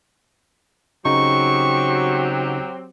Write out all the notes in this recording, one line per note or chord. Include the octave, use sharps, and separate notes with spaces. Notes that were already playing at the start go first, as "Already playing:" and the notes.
C#3 F#3 C4 D#4 G4 C#6